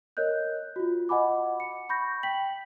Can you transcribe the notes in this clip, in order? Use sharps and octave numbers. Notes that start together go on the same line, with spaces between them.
A#4 C#5 D#5 F#6 G6
F4 F#4
D#5 F#5 G#5 B5 D6
C#7
B5 C#6 G6 A#6
G5 B6 F#7